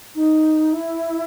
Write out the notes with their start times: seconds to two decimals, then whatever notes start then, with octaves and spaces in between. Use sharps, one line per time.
0.15 D#4
0.73 E4